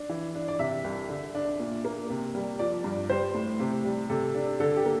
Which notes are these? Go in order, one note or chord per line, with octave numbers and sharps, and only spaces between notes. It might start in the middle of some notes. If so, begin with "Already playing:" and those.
Already playing: D4
E3
D4
D5
C3 E5
C2
D3
D4
A#2
A#3
C3
G3
F3 D5
G2
G3 C5
A2
C3
G3
C3 A4
D4
D3 A4
G4
A#3